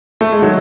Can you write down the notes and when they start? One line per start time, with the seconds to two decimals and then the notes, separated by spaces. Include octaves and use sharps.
0.21 A3
0.32 G#3
0.42 D#3 F#3